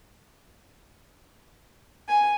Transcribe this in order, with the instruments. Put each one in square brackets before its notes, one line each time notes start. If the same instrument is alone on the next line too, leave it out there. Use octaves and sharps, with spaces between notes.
[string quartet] G#5